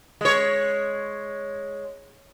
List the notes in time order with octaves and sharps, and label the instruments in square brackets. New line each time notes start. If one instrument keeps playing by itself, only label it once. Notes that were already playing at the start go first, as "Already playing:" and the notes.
[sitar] G#3 C#5